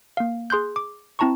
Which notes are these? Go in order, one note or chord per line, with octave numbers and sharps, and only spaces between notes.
A#3 F5
G#4 C6 F#6 G6
D6
C4 E4 A5 A#5 C#6